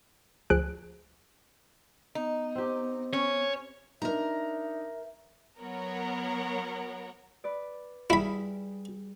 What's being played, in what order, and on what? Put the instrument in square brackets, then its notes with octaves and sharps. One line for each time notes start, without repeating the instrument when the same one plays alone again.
[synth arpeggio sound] D2 F3 G#4 F#6 D7
[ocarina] B3 [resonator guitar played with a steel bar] D#4
[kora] C4 G4
[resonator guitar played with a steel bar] C#4 [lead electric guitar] C#5
[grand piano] D4 D#4 [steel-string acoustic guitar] A#4 A#5 [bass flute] E5
[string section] F#3 B3 A#4 C#5 F#5
[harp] B4 D5
[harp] G3 G#4 [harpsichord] E4 B5